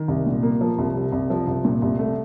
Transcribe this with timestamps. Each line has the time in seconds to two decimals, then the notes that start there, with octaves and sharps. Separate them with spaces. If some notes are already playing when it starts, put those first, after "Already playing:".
Already playing: D#3
0.08 C2
0.26 A#2
0.43 A#3
0.61 F3
0.78 C2
0.95 C3
1.12 C2
1.30 F3
1.47 C2
1.65 A#2
1.82 C2
1.99 A3